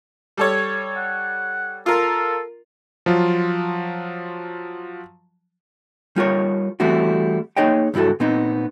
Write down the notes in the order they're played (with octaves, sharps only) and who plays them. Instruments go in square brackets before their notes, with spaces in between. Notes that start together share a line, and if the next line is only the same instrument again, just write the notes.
[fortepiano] G3 A4 C#5
[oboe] F#5
[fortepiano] F4 A#4 [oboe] A4
[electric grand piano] F3 F#3 F4
[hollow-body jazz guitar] G3 F4 A#4 C#5
E3 G3 A3 C4 E4 F#4
A#3 D#4 G#4 C#5 D#5 G5
C#2 G2 E4 F#4 A4
A#2 B3 C4 D#4